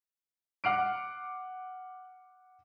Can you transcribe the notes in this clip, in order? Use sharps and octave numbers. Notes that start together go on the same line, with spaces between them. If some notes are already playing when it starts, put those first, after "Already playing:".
F#5 D6 F6 C7 D7